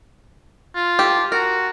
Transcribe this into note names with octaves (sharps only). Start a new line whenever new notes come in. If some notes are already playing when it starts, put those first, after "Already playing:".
F4
G4 A4
F#4 A#4